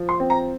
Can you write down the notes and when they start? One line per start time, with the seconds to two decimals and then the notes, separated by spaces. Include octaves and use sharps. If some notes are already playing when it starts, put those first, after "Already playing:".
Already playing: F3
0.09 C6
0.20 C4
0.30 A#5